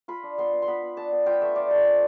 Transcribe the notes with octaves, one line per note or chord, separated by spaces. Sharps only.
F4 B5
D4
B3 C6
B3
C6
B3 B5
B3
D4 A5
B3
F4 G5
A3 E5
F4 D5
A3 C5
C4